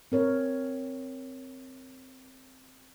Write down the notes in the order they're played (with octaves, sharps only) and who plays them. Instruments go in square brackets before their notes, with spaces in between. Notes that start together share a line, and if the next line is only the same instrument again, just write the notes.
[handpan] C4 A#4 C#5